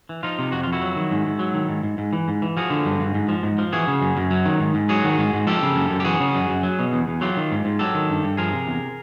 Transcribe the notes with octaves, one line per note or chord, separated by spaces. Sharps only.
E3
F3 D#4 F4
C3
F2 F#4
F2 F4
E4 F#4
F#3
D#3
G#2
G#2
F#3
D#3
G#2
G#2
G#2
E3
G#2
E3
F3 F#4 G#4
D3
G2
G2
G#2
F3
G#2
F3
E3 F#4 G#4
C#3
F#2
F#2
F#3
D#3
G#2
G#2
F#3 F#4 G#4
D#3
G#2
G#2
F3 G4 A4
C#3
F#2
F#2
G4
E3 F#4 G#4
C#3
F#2
F#2
F#3
B2
E2
E2
F#3 F4 G4
D#3
G#2
G#2
F#3 G4 A4
D#3
G2
G2
F3 G#4 A#4
C3
E2